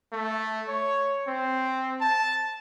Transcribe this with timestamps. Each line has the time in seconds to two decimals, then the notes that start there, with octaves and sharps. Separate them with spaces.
0.13 A3
0.68 C#5
1.28 C4
2.01 A5